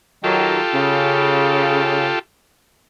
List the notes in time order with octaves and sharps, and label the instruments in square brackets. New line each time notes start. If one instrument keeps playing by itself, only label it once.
[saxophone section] D#3 F#3 [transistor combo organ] F4 G4 A4
[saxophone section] C#3